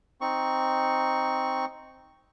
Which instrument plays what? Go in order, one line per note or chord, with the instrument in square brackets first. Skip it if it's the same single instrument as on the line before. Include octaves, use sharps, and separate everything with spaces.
[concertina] C4 D#4 C#6